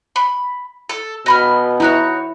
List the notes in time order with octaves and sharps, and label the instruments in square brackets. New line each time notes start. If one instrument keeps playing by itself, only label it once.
[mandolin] B5
A4
[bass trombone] B2 [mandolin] D#5 B5 F6
[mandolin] D#4 F#4 C#5 [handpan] E4